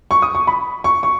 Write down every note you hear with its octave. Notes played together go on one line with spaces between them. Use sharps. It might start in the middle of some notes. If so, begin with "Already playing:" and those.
C#6
D#6
C#6
B5
C#6
C#6